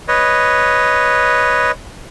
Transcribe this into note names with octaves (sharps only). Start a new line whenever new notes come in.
B4 C#5 D#5